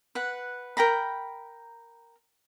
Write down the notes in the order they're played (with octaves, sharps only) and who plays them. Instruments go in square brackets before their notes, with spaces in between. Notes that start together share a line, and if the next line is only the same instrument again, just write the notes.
[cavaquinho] B4 F#5
A#4 G5 A#5 B5